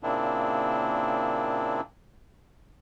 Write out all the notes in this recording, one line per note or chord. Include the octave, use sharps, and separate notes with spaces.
A#2 C#3 A#3 C4 D4 E4